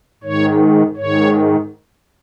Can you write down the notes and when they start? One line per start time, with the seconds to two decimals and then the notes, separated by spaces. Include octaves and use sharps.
0.24 G#2 D#3 C#5
0.97 G#2 D#3 C#5